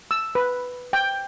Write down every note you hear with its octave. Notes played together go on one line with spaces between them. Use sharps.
E6
B4
G5